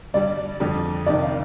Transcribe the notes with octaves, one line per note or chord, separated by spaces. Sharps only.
G2 D3 G3 D5
F2 D3 G3
C2 C3 D#3 D5
F5